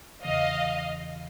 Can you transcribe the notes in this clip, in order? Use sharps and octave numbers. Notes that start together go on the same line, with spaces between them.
E2 C#3 E3 D#5 F5